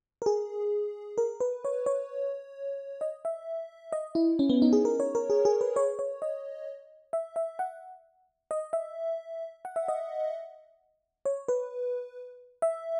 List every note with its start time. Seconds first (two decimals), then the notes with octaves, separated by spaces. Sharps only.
0.22 A#4
0.26 G#4
1.18 A#4
1.40 B4
1.65 C#5
1.86 C#5
3.01 D#5
3.25 E5
3.92 D#5
4.15 E4
4.39 C#4
4.50 B3
4.62 D#4
4.73 G#4
4.85 A#4
5.00 C#5
5.15 A#4
5.30 G#4
5.45 G#4
5.61 B4
5.76 C#5
5.99 C#5
6.22 D#5
7.13 E5
7.36 E5
7.59 F#5
8.51 D#5
8.73 E5
9.65 F#5
9.76 E5
9.88 D#5
11.25 C#5
11.48 B4
12.62 E5